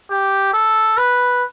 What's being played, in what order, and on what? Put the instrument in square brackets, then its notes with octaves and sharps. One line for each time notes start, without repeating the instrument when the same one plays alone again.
[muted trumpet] G4
A4
B4